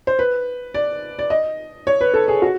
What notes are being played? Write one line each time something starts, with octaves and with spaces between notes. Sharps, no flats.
C5
B4
D5
D5
D#5
C#5
B4
A4
G#4
F#4